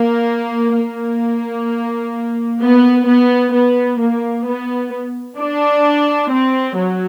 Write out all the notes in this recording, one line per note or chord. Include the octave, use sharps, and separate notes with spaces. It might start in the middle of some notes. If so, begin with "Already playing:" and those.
Already playing: A#3
A#3
B3
B3
B3
A#3
B3
D4
C4
F#3